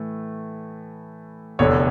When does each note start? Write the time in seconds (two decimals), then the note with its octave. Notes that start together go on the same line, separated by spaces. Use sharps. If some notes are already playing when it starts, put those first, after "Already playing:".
Already playing: A2 E3 A3
1.59 F1 E2 D3 C#5